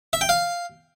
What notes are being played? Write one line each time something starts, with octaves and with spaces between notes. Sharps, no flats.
E5
G5
F5